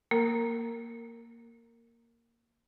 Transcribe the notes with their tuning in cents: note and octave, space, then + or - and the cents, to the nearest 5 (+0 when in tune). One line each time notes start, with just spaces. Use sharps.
A#3 +0 A#4 -15